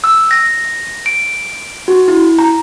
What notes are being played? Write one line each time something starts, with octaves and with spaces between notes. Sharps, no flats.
E6
A#6
D7
F#4
E4
A#5